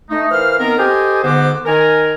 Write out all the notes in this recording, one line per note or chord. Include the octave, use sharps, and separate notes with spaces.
A3 D#4
E3 A#4 C5 F5 F6
D#3 B3 C4 A#4
G4 A4 C5 D#5 G5 G#5
G#2 D3 B3 F#4 C5 D6
D#3 A#4 G#5